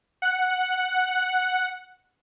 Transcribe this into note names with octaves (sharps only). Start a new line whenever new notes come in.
F#5 F#6